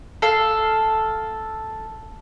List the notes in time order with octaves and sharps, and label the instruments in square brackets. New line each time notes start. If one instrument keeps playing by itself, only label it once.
[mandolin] A4 F5